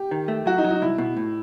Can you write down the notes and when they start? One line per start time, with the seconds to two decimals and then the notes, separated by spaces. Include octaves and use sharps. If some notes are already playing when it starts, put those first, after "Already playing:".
Already playing: G4
0.11 D#3
0.28 A3
0.46 F#3 F#4
0.58 D#4
0.64 F#3
0.70 D#4
0.82 C2 E4
0.98 B2
1.17 A2